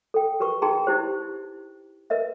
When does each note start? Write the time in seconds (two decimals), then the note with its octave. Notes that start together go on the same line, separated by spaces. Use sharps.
0.14 A4 G5
0.40 G4 A#4 B4 C#6
0.62 D#4 G#4 G5 A5 A#5 C6
0.87 D#4 E4 G4 C5
2.10 A#4 B4 D#5 E5